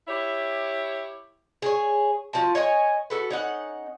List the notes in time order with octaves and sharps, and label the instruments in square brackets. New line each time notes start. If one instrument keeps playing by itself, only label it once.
[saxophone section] E4 G4 C#5
[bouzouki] G#4 C#5
F3 F4 F#4 A5
C#5 D#5 F5 G#5
F#4 A4 B4
C#4 D#4 F#5